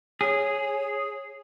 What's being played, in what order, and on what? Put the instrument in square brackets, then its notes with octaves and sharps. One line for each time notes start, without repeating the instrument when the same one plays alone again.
[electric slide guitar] G#4 [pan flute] C#5